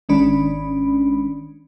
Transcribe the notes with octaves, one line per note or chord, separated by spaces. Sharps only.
G#1 D#3 G#3 C#4 D4 B5